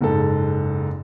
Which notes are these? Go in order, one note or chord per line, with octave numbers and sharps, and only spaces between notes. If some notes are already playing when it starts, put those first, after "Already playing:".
F#1 G#2 A4